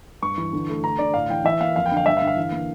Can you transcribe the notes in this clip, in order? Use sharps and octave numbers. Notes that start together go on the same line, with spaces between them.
G2 C#6
E3
D3
A3
D2 A#5
D3 D5
A2 F5
E3 G5
E3 E5
A#3 F5
F2 F5
G5
D3
F5
G2 E5
F5
D3
F5
E3
A#3